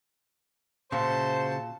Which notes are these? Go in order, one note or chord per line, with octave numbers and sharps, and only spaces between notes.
A#2 C#3 F#4 C5 E5 A5